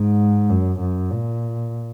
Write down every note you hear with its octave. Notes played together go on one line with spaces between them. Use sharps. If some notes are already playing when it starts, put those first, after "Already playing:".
Already playing: G#2
F#2
F#2
A#2